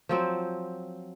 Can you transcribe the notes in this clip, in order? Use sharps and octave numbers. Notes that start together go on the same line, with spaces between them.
F3 F#3 C4